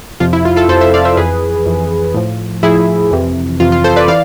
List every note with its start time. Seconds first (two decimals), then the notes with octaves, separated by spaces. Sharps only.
0.20 F2 C3 F3 F4
0.33 E4
0.45 F4
0.56 F4 A4
0.68 F2 C3 F3 A4 C5
0.81 C5 E5
0.94 D5 F5
1.05 C5 E5
1.17 F2 E3 G#4 B4
1.66 F2 E3
2.14 A2 F3
2.63 A2 F3 E4 G#4
3.11 F2 C3 E3
3.60 F2 C3 E3 F4
3.72 F4
3.84 A4 C5
3.96 B4 D5
4.08 E3 D5 F5